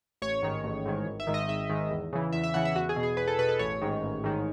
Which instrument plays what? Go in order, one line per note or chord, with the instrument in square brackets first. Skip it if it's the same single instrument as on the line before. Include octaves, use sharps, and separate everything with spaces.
[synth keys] A1 C#5
G#2 D#3
A1
G#2 D#3
G#1
E5
G#2 D#3
D#5
G#1 E5
G#2 D#3
E2
C#3 E3
E2 E5
E5
C#3 E3 F#5
E5
E2 F#4
G#4
B2
G#4
E2 B4
A4
B2 B4
A4
A1 C#5
G#2 D#3
A1
G#2 D#3